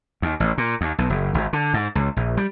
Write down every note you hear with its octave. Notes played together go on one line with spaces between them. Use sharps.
D#2
A1
A#2
D#2
B1
F#1
G#1
D3
G#2
C#2
A#1
G3